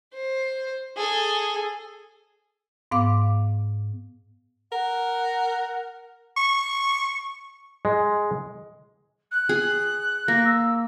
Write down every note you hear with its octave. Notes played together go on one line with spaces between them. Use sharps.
C5
G#4 A4
G#2 B3 F5 D6
A#4 F#5
C#6
G#3
F#6
G#4
A#3 A#6
E6